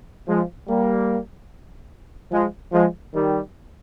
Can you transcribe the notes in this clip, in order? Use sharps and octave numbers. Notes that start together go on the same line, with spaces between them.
F3 G#3
G3 A#3
F3 G#3
F3 G#3
D#3 G3